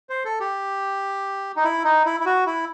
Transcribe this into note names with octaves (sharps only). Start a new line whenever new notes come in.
C5
A4
G4
D#4
E4
D#4
E4
E4
F#4
E4